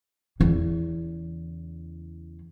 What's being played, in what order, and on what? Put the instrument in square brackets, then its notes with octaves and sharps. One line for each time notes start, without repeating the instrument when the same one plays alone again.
[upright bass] E2 C#3